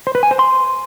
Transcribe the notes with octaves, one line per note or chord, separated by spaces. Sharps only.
C5
B4
G#5
C5
C6